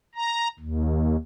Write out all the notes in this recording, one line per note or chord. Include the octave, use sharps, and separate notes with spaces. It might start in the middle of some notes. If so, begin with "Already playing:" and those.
A#5
D#2